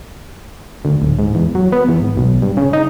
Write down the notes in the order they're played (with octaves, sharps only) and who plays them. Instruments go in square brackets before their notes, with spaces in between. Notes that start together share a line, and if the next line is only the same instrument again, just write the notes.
[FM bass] D2
D1
G#2
E2
F#3
B3
E2
G#1
B1
G2
C#3
D#4